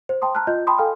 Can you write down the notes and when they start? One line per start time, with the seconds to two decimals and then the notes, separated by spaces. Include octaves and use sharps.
0.09 C5
0.22 G5 A5 C6 D#6
0.35 A5 A#5 F6 F#6
0.47 F4 D#5 G6
0.67 G5 A5 B5 C6 D#6
0.78 A4 F5 G5 G#5 F6